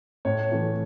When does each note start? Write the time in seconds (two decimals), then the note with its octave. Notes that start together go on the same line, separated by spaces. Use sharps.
0.25 A2 C#5
0.51 E3 A3